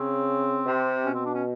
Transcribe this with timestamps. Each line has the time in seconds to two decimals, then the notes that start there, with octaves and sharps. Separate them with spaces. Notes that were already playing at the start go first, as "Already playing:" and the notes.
Already playing: C#3 C4
0.66 C3
1.05 B2 C#4
1.15 C4
1.25 D4
1.34 C#4